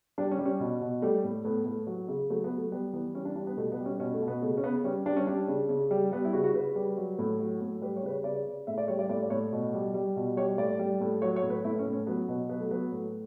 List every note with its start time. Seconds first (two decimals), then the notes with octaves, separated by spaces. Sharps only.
0.18 G3 D4
0.31 C#4
0.39 G3
0.45 C#4
0.60 B2
0.81 B2
1.02 G3 A3
1.24 A2
1.45 A2 B3
1.65 A2
1.87 F#3
2.08 C#3
2.30 F#3 A3
2.44 B3
2.51 F#3
2.58 A3
2.72 G3 B3
2.93 E3 B3
3.15 G3 C#4
3.25 D4
3.36 G3 D4
3.47 B3
3.57 B2 A3
3.72 B3
3.79 G3
3.86 C#4
4.00 B2 C#4
4.14 A3
4.22 B2
4.28 B3
4.42 C#3 A3
4.57 C#4
4.64 C#3 B3
4.84 G3 C#4
5.06 G3 D4
5.17 C#4
5.27 G3 D4
5.48 C#3
5.69 C#3
5.91 G3
6.12 G3 B3
6.25 E4
6.33 C#3 F#4
6.44 F#4
6.54 C#3 B4
6.76 G3
6.97 F#3
7.19 A2
7.40 F#3
7.61 A2
7.82 G3 B4
7.96 C#5
8.03 C#3 B4
8.10 C#5
8.24 C#3 D5
8.46 C#3
8.67 A2 E5
8.78 D5
8.88 G3 C#5
8.99 D5
9.09 A2 D5
9.23 D5
9.30 A2 C#5
9.52 B2
9.74 G3
9.94 G3
10.16 B2
10.37 G3 C#5
10.58 A2 D5
10.79 G3
11.01 A2
11.22 F#3 C#5
11.36 C#5
11.43 A2
11.50 B4
11.64 A2 E4
11.79 C#4
11.86 A2
11.93 C#4
12.07 F#3 B3
12.28 B2 B3
12.49 F#3 B3
12.60 A3
12.71 F#3 B3
12.92 A2